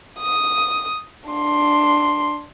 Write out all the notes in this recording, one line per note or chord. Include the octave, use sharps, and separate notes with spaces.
D#6
D4 C6